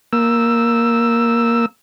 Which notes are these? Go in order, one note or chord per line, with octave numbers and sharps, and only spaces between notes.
A#3 E6